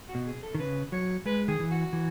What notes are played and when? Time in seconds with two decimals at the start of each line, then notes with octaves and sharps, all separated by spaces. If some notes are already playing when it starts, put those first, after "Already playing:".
0.09 F#4
0.15 B2
0.26 G#4
0.42 A4
0.55 D#3
0.59 C#3 B4
0.92 F#3 C#5
1.26 G#3 B4
1.48 D#3 G#4
1.60 E3
1.71 F#4
1.93 E3